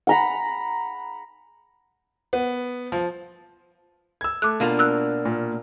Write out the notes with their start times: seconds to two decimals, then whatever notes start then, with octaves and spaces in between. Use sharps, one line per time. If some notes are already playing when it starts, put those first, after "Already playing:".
0.07 F#5 A#5 B5
2.33 B3
2.92 F3
4.21 E6 G#6
4.42 A3 D6 F#6
4.60 B2 A#3 D4 F4
4.79 E6 F#6
5.25 A#2